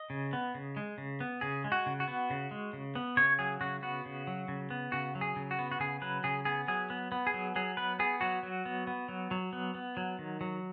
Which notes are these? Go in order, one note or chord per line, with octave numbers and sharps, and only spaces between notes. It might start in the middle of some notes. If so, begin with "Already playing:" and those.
Already playing: D#5
C#3
B3
C#3
G#3
C#3
B3
C#3 G#4
G#3
F#4
C#3
F#4
B3
C#3
G#3
C#3
B3
C#3 C#5
F#3 G#4
C#3 F#4
B3 F#4
C#3
F#3
C#3
B3
C#3 F#4
F#3
G#4
C#3
F#4
B3
F#4
C#3 G#4
F#3 B4
C#3 G#4
B3 G#4
F#3 G#4
B3
B3
G#4
F#3
F#3 G#4
B3 B4
B3 G#4
F#3 F#4
F#3
B3
B3
F#3
F#3
B3
B3
F#3
D#3
F#3